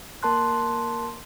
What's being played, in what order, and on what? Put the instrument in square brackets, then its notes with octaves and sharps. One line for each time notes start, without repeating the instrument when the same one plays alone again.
[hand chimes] A#3 A#4 A5 C6 F#6